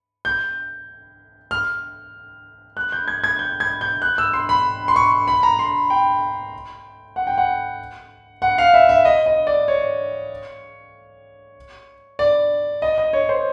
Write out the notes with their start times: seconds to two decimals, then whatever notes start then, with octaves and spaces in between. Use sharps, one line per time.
0.25 G6
1.51 F6
2.77 F#6
2.92 G6
3.08 G#6
3.24 G#6
3.39 G6
3.60 G#6
3.81 G6
4.02 F#6
4.18 E6
4.33 C6
4.49 B5
4.88 C6
4.96 C#6
5.28 B5
5.43 A#5
5.59 C6
5.90 G5
7.16 F#5
7.27 G5
7.38 F#5
8.42 F#5
8.58 F5
8.74 E5
8.89 E5
9.05 D#5
9.26 D#5
9.47 D5
9.68 C#5
12.19 D5
12.82 D#5
12.98 D#5
13.13 C#5
13.29 C5